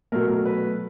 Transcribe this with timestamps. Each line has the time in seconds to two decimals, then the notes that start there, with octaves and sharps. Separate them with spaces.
0.12 B2 F#3 A3 A#4
0.28 A#4
0.45 B4